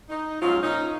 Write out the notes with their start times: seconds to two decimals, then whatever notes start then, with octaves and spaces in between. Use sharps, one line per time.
0.09 D#4
0.42 G#2 F3 F#3 C#4 F4
0.63 A#2 C#4 D#4